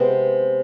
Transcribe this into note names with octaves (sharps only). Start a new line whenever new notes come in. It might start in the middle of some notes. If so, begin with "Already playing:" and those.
Already playing: C3 G#3 B3 C4